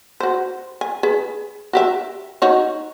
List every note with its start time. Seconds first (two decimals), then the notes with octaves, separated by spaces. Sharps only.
0.20 F#4 C5
0.81 G#5
1.03 G#4 B4
1.73 F#4 G4 E5
2.42 D#4 F#4 C#5